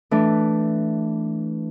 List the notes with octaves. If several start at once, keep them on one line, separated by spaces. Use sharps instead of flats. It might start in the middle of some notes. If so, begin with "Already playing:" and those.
E3 A3 D4